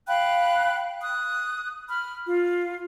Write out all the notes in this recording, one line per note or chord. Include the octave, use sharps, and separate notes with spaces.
F5 G5 B5 F#6
D#6 F#6
B5 F6
F4